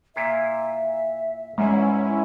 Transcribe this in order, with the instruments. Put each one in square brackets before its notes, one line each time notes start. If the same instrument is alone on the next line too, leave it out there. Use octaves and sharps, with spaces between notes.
[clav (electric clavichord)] A#2 E4 F4 [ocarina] E5
[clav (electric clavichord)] E2 G#2 [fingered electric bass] G#3 [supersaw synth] C#4 E4